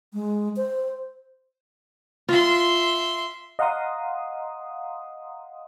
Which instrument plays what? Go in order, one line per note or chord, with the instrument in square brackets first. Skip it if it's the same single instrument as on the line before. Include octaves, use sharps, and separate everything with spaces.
[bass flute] G#3
C5
[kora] F4 [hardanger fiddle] E5 C6
[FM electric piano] D#5 F5 F#5 A#5 C6 D#6